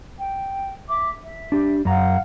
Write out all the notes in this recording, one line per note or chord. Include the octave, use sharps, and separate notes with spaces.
G5
E5 D6
E5
D4 G4
F#2 F5 F#5 A#5